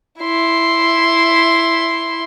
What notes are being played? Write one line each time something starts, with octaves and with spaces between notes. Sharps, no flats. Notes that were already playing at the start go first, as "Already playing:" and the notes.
E4 C6